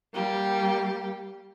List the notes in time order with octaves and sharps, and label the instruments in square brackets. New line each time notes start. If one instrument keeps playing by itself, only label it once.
[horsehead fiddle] G3 A#3 [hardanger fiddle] G4